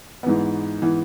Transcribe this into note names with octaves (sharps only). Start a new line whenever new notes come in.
G#2 E3 B3
E3 B3